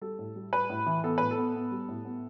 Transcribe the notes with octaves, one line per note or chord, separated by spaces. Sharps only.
G3 A4
A2
G3
G3 B4
A2
E3
B3 A4
A2 B4
A4
B3
B3
G3
A2
B3